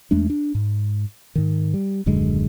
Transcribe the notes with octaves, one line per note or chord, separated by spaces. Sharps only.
E2 G#3 A3 D4
D4
G#2
G#2 D#3
G3
D#1 F#2 D3 G#3